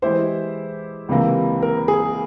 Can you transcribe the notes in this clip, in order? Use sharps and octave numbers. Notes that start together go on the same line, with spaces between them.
E3 G#3 E4 G4 C5
C#2 C3 E3 A#3
A#4
G#4